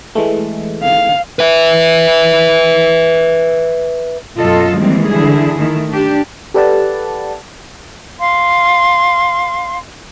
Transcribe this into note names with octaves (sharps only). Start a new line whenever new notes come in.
E3 G#3 A3
F5
B4 E5
F#2 B2 F#3 F4 A4 D#5
D#3 E3 G3 G#3 A#3 C4
D3 E3 E4 G#4
D#3 A3 E4
D4 G4
G4 A4 B4 D5 F#5 A5
F5 C6